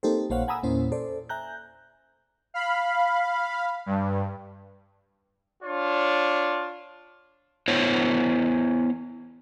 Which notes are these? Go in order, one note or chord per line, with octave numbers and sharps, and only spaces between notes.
A#3 C4 D#4 G4 A4 C5
A#1 A#3 C5 C#5 F5 F#5
F#5 G#5 A#5 B5 D#6 E6
E2 A#2 A#3 C#4 E4 C5
A4 C5 D5
E5 G#5 A#5 F#6 G6
F5 B5
G2
D4 F4 C#5
B3 E4 C5 C#5